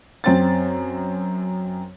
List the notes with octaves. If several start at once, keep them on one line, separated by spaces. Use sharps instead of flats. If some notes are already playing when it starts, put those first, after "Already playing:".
F#2 C4 A6